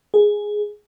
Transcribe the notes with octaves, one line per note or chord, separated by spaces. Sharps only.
G#4